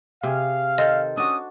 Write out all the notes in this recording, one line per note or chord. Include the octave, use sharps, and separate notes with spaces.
C3 G#4 F5
D#3 A4 C5 D#5
C#4 D4 F#4 D#6